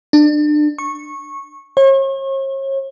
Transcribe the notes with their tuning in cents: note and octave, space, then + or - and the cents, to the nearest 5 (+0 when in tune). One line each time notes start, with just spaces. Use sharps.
D4 +30
C#6 -15
C#5 -40